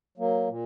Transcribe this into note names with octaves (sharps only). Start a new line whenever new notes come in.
F#3 A#3
A#2